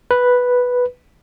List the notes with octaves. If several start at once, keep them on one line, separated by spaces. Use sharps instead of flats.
B4